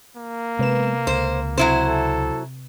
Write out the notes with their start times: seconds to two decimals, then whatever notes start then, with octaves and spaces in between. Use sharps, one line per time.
0.17 A#3
0.59 C3 G#3 B3 B4 E7
1.07 C#2 C5
1.58 C3 F#3 E4 C5
1.87 A4